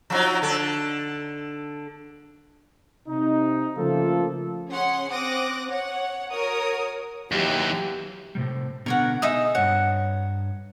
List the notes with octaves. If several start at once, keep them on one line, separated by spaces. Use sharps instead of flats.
F3 F#3 D#4
D3 A4
C3 D#4
C#3 F3 A3 A#3 F4 A4
C#4 G#4 F#5 C6
C4 D6 D#6 F#6 A#6
C#5 F#5
F#4 A#4 C#5 D#6
D#2 E3 F#3 G4
A2 C3 G3
B2 D3 B3 A#4 C#5 F#5
D#4 G#4 E5 D#6
G2 C#5 F#5